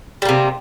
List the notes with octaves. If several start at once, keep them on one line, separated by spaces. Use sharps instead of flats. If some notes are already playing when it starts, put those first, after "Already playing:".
C3 G3 A#3